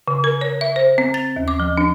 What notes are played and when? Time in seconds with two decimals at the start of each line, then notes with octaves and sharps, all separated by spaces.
0.08 C#3
0.24 A#4
0.41 C#5
0.61 E5
0.76 C5
0.98 C4
1.14 A6
1.36 D#2
1.48 D6
1.60 F3
1.78 D4